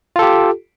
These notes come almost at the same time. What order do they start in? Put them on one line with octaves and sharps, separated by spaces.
F4 A4 G4